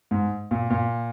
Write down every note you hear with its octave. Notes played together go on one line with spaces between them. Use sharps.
G#2
A#2
A#2